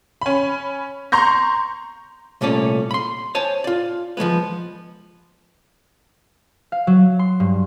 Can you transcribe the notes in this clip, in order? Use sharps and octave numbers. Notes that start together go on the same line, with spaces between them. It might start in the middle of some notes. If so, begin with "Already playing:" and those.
C#4 B5
A#5 C6 C#6 G6 A#6
C2 A#2 A3 C#4 D5
B5 C6
C5 C#5 G#5 A5
F4 D5
F3 F#3 G#3 B3
F5
F#3
C6
G2